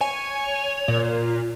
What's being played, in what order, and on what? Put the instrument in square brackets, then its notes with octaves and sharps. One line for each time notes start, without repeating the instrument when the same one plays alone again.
[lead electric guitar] C#5 [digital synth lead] G#5
[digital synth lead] A#2